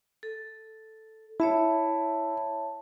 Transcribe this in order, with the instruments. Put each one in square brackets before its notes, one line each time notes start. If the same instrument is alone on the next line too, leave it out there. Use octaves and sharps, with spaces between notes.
[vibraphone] A4
[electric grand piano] E4 [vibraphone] C#5 E5 A5